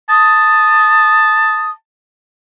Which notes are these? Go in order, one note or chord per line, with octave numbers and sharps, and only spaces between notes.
A5 D#6